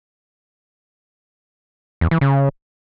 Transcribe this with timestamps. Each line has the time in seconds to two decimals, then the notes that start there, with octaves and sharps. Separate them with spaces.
2.01 E2
2.11 E3
2.21 C#3